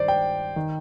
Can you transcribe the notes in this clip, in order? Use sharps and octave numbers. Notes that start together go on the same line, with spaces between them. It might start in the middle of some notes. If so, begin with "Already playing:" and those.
Already playing: G2 D#3 C5 D5
G5
D#3